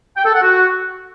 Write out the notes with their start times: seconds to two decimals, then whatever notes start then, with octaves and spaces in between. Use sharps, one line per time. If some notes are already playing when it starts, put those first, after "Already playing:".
0.17 G5
0.25 A4
0.33 F#5
0.41 F#4